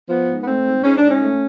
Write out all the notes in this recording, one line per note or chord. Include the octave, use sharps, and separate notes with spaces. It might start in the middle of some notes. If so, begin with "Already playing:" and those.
F3 B3
G#2
B3
A3 C4
G#2
G#2 C#4
D4
G#2
C#4
A3